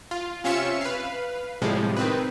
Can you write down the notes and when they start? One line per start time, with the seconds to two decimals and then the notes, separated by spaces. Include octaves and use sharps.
0.11 F4
0.44 C3 C#4 F4 E5 C#7 E7
0.81 B4 F5
1.62 A2 C3 F3 G3 G#3
1.97 D#3 C4 B4